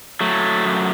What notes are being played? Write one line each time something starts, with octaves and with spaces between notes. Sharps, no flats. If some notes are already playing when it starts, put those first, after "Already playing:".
F#3 A3
F#2